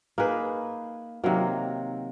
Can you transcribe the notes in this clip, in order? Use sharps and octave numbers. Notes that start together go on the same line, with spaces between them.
A#3 D#4 G#4 B4
C3 D#3 F#3 A#3